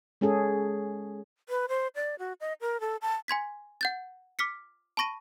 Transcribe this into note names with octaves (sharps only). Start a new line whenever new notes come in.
G#3 C#4 G#4 A4
B4
C5
D5
F#4
D#5
A#4
A4
A5
G#5 C6 G#6 B6
F#5 G6 A6
D6 F6 B6 C#7
A5 B5 C#6 A#6 D#7